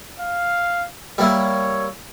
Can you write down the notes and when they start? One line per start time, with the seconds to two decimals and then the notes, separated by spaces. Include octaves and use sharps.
0.20 F5
1.18 G3 A#3 E4 C#5